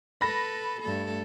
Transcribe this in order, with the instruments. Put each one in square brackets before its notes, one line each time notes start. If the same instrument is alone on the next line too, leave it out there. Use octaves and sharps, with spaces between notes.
[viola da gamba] A4 B4 [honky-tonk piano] B5 A#6
[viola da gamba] G2 A3 A4